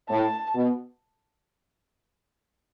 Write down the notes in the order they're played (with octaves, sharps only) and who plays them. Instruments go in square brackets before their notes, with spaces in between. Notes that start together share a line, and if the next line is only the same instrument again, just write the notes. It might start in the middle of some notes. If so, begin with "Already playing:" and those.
[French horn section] A2 [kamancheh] A5
[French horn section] B2